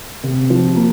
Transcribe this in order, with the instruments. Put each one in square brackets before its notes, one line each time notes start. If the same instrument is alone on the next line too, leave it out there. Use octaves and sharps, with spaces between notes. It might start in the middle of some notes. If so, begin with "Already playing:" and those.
[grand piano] C3
F3
A#3